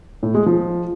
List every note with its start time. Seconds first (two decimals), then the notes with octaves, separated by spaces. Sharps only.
0.23 A2
0.35 G#3
0.46 F3